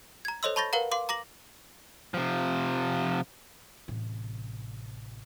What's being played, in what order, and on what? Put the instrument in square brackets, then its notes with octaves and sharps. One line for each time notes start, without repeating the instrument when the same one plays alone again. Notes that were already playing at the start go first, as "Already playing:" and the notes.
[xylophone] A#5 G#6
A4 C5 C#5 D#5 C6 E6
A5 B5 C#6 G6 A6 A#6
A#4 B4 F5 F#5 A#5
F5 C6 D6
A#5 D6 A#6 F#7
[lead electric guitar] C3 F3
[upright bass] A1 C3